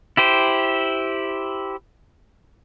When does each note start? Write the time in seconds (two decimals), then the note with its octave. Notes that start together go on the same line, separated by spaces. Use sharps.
0.17 E4 G4 C5